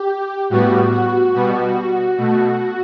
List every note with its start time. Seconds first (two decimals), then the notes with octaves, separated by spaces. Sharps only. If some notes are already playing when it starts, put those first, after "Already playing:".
Already playing: G4
0.50 A2 G3 B3 F#4
0.92 F#4
1.33 B2 G3 B3 F#4
2.18 B2 A3